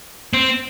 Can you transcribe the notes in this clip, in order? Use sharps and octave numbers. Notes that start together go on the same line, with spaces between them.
C4